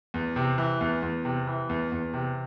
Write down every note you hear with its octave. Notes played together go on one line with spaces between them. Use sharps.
E2
C3
E3
E2
E2
C3
E3
E2
E2
C3